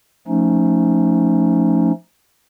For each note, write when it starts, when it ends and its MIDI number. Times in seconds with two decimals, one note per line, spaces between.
0.28 1.91 53
0.28 1.91 57
0.28 1.91 61
0.28 1.91 63